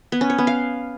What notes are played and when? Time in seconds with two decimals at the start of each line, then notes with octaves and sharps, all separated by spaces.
0.12 B3
0.21 C#4
0.30 C#5
0.38 B3
0.47 F5